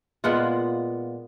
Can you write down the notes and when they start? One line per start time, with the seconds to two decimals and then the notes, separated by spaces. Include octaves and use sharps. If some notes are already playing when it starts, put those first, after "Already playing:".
0.24 A#2 G#3 B3 F4 F#5